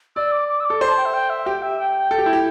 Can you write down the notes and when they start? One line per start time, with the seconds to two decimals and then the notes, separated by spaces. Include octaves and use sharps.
0.16 D5 E6
0.32 D6
0.48 D6
0.60 E6
0.65 D6
0.70 A4
0.81 C5 C6
0.89 A5
0.97 G5
1.06 E5
1.14 G5
1.30 E5
1.46 G4 G5
1.62 E5
1.79 G5
2.11 A4
2.19 G4
2.26 E4
2.33 G4